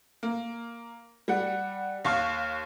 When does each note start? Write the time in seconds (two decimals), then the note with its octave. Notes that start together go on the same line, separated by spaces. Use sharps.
0.23 A#3
1.28 G3 F#5
2.05 D#2 F5 C#6